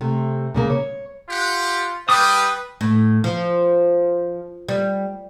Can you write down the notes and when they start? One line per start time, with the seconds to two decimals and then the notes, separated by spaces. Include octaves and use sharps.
0.01 C3 A3
0.54 A#2 C#3 A#3
0.70 C#5
1.30 F4 G4 F#5
2.09 G3 B4 G5 D6 D#6
2.81 A2
3.24 F3
4.69 G3